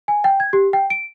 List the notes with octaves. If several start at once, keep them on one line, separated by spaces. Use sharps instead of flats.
G#5
G5
G#6
G4
G5
D7